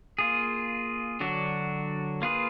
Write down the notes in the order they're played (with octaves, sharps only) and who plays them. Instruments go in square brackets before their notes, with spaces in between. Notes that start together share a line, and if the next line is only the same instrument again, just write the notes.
[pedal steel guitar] A#3 F4 G#4
D3 F#3 D4 F#4
A#3 F4 G#4 B4